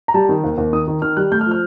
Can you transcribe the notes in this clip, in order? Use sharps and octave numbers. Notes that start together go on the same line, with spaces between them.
A#5
G3 A5
D#3
D#2
D#2
D#3 D#6
D#3
D#3 F6
G3 F#6
A3 G6
F6
F3
F6